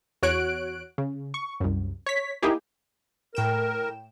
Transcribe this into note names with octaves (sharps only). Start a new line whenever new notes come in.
E2 F#4 C#5 F#6 D7
C#3
C#6
C2 F#2
C#5 B6
A#3 D#4 E4 G4 G#4
A2 A#4 G5 E7